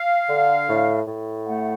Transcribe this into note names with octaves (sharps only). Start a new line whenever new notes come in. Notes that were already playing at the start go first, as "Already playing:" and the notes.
Already playing: F5
D3
A2
A2
A3 F#5